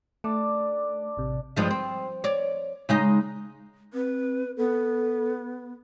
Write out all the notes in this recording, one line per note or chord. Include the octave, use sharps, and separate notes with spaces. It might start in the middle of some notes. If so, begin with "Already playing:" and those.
A3 D4 D5
A1 C3
G2 F3 G#3
C4
C#5 D5
C#3 G#3 D#4
C4 B4
B3 A4